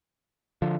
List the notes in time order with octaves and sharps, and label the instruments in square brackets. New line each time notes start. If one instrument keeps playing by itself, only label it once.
[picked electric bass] D3 F3